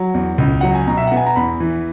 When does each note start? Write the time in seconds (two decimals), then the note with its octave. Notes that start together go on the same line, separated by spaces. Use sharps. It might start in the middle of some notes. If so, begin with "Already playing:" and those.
Already playing: F#3
0.14 E2
0.38 C#2
0.61 F#3 F#5
0.75 G#5
0.87 B2 A#5
0.97 E5
1.07 B3 F#5
1.17 G#5
1.26 A#5
1.36 E2 B5
1.60 E3